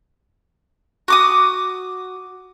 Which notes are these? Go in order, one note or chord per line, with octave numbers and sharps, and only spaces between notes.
F#4 D6 D#6